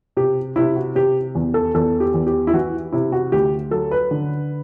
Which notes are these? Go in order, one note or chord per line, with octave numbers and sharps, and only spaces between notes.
C3 G4
C3 E4
F#4
C3 G4
E2
A4
E2 A4
G4
E2
G4
E4
E3 F#4
C3 E4
F#4
D2 G4
F#3 A4
B4
D3